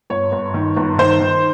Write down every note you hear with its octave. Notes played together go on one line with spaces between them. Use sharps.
G1 C#5
G1
D#3
G1
D#3 C5
D#3